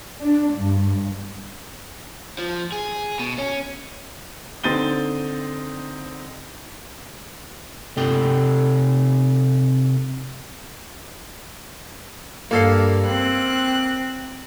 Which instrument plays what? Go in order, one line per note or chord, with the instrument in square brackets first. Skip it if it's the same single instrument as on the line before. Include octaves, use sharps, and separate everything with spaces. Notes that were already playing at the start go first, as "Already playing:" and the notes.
[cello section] D4
G2
[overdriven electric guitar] F3
G#4
B2
C#4
[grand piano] D3 C4 D#4 A6 D#7 G7
[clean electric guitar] C3 A4 G5
[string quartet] G2 [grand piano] A#3 A4 F5
[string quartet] C4 F#6